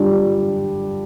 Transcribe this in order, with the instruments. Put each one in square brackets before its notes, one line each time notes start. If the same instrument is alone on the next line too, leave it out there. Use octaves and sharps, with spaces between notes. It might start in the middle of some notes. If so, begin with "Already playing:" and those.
Already playing: [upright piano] D3 G3 D4 F4